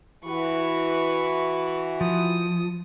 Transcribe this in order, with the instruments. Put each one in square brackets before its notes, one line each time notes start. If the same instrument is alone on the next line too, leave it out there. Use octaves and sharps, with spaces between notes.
[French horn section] E3 F#4 [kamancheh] B4 C#6
[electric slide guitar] F3 [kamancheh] D#6